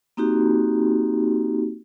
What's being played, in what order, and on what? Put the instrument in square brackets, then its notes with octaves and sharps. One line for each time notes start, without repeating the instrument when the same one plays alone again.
[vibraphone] A#3 C4 D#4 F#4 G4